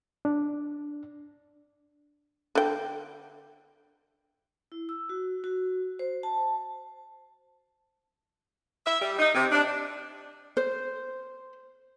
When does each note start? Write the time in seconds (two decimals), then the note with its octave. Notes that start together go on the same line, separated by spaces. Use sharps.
0.25 D4
2.55 D3 G5
4.72 E4
4.89 E6
5.09 F#4
5.44 F#4
5.99 C5
6.23 A5
8.86 E5
9.01 G3
9.19 D#4
9.35 C3
9.51 D4
10.57 C5